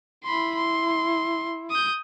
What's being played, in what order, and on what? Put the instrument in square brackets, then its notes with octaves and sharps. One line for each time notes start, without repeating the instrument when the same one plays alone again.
[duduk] E4 [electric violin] B5 C6
[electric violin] C6
D#6 G6